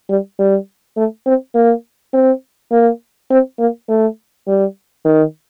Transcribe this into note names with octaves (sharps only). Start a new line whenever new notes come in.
G3
G3
A3
C4
A#3
C4
A#3
C4
A#3
A3
G3
D#3